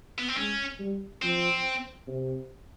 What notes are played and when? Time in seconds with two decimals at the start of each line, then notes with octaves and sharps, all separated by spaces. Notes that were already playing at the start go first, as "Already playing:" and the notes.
0.19 B3
0.29 C4
0.37 G#3 C#4
0.79 G3
1.22 F3 C4
2.08 C3